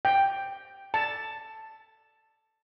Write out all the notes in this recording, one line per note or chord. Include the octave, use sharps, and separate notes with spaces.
G5
A5